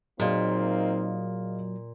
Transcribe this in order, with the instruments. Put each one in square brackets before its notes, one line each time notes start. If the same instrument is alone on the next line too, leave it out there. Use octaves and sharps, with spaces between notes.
[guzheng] A#2 [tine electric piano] F#3 [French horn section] A#3 C4 D#4 [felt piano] G#4 D#5 F5